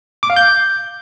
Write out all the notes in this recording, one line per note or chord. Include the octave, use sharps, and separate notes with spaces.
D6
F5
G6